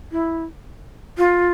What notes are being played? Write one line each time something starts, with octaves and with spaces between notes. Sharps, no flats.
E4
F4